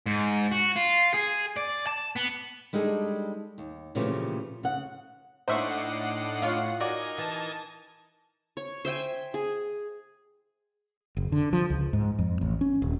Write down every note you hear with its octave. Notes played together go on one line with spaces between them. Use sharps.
G#2
F#4
F4
G#4
D5
A5
B3
G3 G#3 D4 D#4 G#4 A4
D#2
A#2 C#3 E3 F3 A3 G4
C#3 F#5
A2 D4 D#4 C5 E5 F#5 C#6 C7
F4 C#5
D#4 F#4 A#4 D5 G#5
E3 A5
C#5
C5 E5 G5 G#5
G#4
F#1
D3
F3
C#2
G#2
F2
A1
C#4
D#1